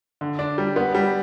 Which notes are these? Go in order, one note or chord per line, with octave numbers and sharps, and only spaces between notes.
D3
D4
G3
B3
G3